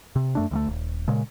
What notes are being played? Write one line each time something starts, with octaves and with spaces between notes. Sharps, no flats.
C3
F#2 A3 D4
D2 G3 A3
D#1
A#2 C#3 G#3